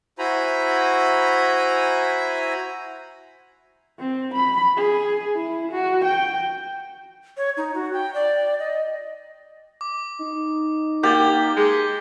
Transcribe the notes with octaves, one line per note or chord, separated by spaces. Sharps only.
E4 F#4 C5 G#5 A#5 B5
C4
B5
G#4
E4
F#4
G5
C#5
D#4
F#4
G5
D5
D#5
D6
D#4
A#3 G4 G6 A6 G7
G#3 C#7